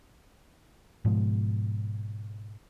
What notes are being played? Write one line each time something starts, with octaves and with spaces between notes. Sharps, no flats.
G#2 B2 F3 G#3